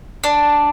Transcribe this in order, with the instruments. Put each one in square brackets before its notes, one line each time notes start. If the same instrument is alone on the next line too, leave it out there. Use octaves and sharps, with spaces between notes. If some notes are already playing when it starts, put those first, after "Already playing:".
[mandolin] D4